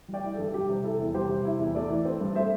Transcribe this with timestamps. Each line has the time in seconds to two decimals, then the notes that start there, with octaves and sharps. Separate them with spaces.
0.08 G3
0.14 D5 G5
0.24 E4
0.34 A4
0.39 G2
0.54 G3 G4
0.69 C3
0.84 E4 A4
0.99 E2
1.14 G3 G4 C5
1.29 C3
1.45 E4
1.59 E2
1.74 A3 A4 D5
1.90 E3
2.05 C4
2.20 G2
2.35 A3 C5 E5